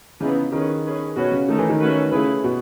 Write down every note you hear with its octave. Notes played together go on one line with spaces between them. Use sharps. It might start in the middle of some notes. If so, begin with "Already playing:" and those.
C#3 E3 B3 D#4 G#4 B4
D#3 C#4 G#4 B4
C#4 G#4 B4
B2 C#4 F#4 B4
C#3
D#3 A3 D#4 A4
E3
D#3
A3 C#4 F#4 B4
C#3 A3 E4 G#4 B4
B2